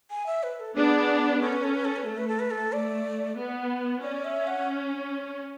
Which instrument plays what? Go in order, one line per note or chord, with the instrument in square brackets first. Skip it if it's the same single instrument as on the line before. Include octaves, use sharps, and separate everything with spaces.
[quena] G#5
E5
B4
A4
[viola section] B3 D4 [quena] G#4
[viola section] C#4 [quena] A4
[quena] B4
A4
B4
A4
B4
[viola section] A3 [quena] A4
[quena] B4
A4
B4
A4
[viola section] A3 [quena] D5
[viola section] B3
[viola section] C#4 [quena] D5
[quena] E5
F#5